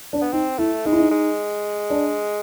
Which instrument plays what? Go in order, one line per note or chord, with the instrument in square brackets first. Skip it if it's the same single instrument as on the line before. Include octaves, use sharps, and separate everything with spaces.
[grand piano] D4
[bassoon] B3
[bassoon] C4 [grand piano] D#4
[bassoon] A3 [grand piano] E4
[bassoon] G#3 [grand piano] D#4
[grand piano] E4
D#4
[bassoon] G#3
[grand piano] D4